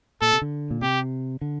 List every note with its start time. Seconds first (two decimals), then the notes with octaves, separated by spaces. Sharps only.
0.22 A#2 A4
0.32 C3
0.42 D3
0.71 A#2
0.82 C3 G4
1.41 D3